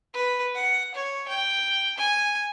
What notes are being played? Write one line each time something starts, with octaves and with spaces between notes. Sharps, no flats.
B4
F#5
C#5
G5
G#5